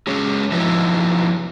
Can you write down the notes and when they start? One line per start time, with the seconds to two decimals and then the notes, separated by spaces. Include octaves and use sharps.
0.07 F#3 G#3 C#4 G#4 C#5
0.52 F3 F#3 B3 D#4 E4